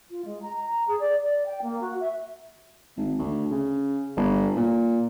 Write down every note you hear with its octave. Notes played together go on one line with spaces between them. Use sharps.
F4
G#3
A#5
A#5
G#4
D5
D5
G5
A#3
F#4
E5
G#1
D2
C#3
G1
A#2